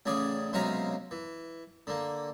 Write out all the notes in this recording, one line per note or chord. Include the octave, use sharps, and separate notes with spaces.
A1 C#3 G#4 D5
B1 C3 G#3 C#4 F5 A#5
E3
D3 A#3